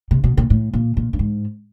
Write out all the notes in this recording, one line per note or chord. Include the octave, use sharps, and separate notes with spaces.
C3
B2
A#2
A2
A#2
A#2
G2
G#2